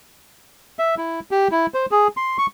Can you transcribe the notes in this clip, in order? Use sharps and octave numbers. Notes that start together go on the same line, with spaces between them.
E5
E4
G4
E4
C5
G#4
C6
C#6